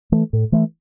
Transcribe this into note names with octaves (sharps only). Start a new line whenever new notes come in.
E3 A3
A2
E3 A3